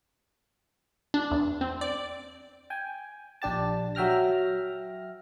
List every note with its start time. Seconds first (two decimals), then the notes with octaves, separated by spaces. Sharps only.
1.14 D4
1.31 E2
1.61 C4
1.81 D5
2.70 G5 G#5
3.42 A#1 D4 G4 A5
3.95 F#3 E5 G5 F6 A#6